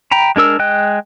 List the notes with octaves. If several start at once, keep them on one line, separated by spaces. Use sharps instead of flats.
G5 A#5 B5
G#3 D4 A#4 E6
G#3 D#5 G5 F#6